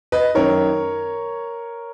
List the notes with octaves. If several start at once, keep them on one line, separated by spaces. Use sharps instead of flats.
B4 D#5
F#2 D#3 A#4 C#5